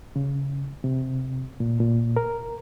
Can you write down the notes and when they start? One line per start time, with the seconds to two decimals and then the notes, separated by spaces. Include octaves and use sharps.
0.16 C#3
0.84 C3
1.60 A#2
1.80 A#2
2.16 A#4